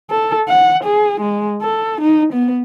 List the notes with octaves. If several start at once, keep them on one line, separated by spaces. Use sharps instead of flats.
A4
F#5
G#4
G#3
A4
D#4
B3